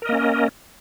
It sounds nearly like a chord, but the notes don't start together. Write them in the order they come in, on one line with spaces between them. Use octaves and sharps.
A#4 D#5 A#3 C#4